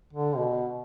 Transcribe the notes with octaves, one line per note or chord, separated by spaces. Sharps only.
D3
B2